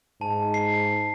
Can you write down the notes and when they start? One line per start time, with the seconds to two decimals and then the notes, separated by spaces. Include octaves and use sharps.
0.21 G#2 A5
0.54 C7